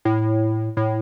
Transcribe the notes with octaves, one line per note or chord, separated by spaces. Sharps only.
A2
A2